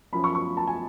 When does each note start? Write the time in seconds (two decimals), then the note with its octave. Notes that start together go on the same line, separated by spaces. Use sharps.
0.13 F#2 F3 B5
0.24 C#6
0.35 C#6
0.57 A5
0.67 G#5